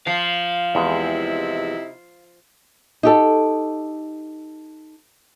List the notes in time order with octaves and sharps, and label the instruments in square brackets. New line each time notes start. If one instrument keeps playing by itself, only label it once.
[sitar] F3 [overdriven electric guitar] F5
[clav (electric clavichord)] E2 G#3 [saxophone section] C3 D#4 E4
[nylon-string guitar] D#4 G4 A4